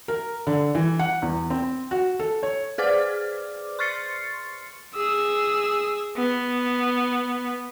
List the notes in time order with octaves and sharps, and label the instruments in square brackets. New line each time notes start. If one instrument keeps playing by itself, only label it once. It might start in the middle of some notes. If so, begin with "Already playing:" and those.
[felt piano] A#4
D3
E3
F#5
E2
C4
F#4
A4
C#5
[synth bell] G#4 B4 C5 D5 D6 F6
C6 C#6 F6 A6 C7 C#7
[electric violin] G#4 E6
B3